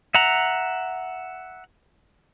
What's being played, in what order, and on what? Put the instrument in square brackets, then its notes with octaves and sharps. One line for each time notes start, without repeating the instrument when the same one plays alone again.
[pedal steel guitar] E5 F#5 A#5